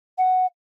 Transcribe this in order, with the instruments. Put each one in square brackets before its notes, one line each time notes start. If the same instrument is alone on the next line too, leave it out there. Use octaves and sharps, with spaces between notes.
[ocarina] F#5